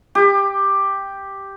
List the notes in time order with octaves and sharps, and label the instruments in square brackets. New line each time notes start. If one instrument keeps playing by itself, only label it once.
[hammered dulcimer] G4